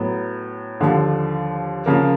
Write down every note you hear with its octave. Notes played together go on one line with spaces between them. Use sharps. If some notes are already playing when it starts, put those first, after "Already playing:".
Already playing: A2 F#3 B3
D#2 D3 F3
C#3 F3 A#3